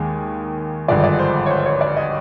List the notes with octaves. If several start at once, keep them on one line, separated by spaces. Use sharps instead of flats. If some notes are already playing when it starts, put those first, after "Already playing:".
Already playing: D#2 D#3 G#3
G#1 G2 D3 F3 G#3 D5
D#5
D5
C5
C#5
C5
C#5
D5
D#5